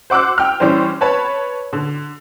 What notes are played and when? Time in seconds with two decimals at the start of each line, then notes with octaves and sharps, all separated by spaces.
0.10 C5 F#5 D6 E6 F#6
0.38 G5 F6
0.60 E3 G3 C#4 D4 C5
1.01 B4 C#5 A5 B5
1.73 D3